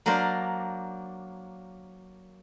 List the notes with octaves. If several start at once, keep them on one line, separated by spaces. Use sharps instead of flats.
F#3 A#3 D4 A#4 C5 D5